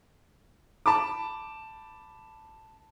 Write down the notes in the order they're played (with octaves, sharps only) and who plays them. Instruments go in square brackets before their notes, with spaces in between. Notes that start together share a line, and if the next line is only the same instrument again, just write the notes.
[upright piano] A5 B5 D6